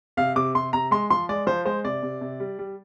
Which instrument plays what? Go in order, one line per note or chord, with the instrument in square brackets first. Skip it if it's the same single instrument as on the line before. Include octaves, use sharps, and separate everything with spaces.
[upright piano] C3 F5
C3 D6
C3 C6
C3 A#5
G#3 C6
F3 C6
G#3 D5
F3 C5
G#3 C5
C3 D5
C3
C3
G3
G3